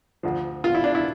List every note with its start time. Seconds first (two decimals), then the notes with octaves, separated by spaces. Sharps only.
0.23 D2 D3 F3
0.64 F4
0.74 E4
0.84 D4
0.95 E4